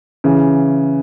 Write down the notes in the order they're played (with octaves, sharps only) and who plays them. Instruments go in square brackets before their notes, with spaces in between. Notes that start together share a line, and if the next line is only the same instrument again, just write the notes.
[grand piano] C#3 E3